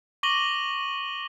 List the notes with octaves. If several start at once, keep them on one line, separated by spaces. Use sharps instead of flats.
C#6 D6 A#6 D#7 F#7 G7